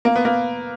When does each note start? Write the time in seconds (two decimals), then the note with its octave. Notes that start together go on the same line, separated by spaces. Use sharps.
0.05 A#3
0.16 B3
0.25 A#3